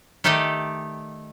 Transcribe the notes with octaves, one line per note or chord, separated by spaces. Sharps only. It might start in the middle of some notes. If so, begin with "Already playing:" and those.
D#3 A3 G4 A4 D5 D#5